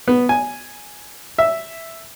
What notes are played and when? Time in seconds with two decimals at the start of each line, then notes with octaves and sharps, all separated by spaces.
0.08 B3
0.29 G#5
1.38 E5